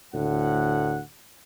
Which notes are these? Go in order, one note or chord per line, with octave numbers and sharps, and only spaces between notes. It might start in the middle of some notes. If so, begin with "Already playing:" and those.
D2 A2 F#5